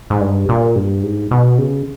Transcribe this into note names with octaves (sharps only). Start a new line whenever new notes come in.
G#2
G2
A#2
G2
G#2
B2
C#3